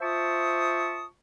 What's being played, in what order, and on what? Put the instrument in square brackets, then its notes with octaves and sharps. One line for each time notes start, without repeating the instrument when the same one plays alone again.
[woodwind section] F4 C5 E5 A5 C#6 D#6